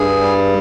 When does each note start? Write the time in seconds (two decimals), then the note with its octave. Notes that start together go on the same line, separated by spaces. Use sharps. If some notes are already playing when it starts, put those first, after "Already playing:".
Already playing: G2 G#4
0.21 G3